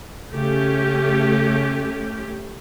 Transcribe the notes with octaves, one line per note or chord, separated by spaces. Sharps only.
C#3 A3 C#4 G4